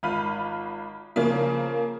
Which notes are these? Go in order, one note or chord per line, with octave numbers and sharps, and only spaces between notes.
G#1 F4 B5 F6 D#7
C#3 F3 A#3